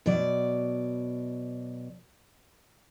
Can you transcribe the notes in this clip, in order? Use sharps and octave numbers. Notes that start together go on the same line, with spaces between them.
B2 F#3 D5